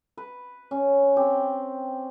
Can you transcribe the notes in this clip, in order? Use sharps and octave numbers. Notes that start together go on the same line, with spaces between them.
B4
C#4
C4 G4